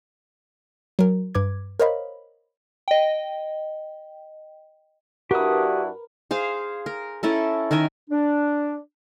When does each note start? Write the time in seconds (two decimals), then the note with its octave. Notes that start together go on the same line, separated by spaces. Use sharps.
0.99 F#3 A#4
1.35 G2 B4 D6 G#6
1.80 A#4 C5 C#5 D#5 F5 B5
2.88 D#5 G5
5.31 G2 D4 E4 F#4 G4 A#4 B4 D#6
6.31 G#4 C5 F5
6.86 A#4
7.23 C#4 E4 A4 A#4
7.71 D#3 A#4 E5 G#5
8.10 D4